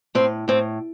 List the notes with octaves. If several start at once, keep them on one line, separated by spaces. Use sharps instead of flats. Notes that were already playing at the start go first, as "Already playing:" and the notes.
A2 C4
A2 C4